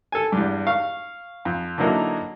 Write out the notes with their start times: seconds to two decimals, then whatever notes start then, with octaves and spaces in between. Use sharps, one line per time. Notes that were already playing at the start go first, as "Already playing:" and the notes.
0.12 A4 G#5
0.32 E2 G2
0.67 F5 C#6
1.45 F2
1.78 D3 E3 F#3 A#3 D#4 E4